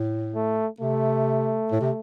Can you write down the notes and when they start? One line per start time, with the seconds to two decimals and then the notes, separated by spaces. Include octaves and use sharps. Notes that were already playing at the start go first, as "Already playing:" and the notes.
Already playing: A2
0.35 A3
0.80 C3 A3
1.72 A2
1.81 C3